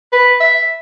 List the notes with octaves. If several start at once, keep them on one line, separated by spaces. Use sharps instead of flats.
B4
E5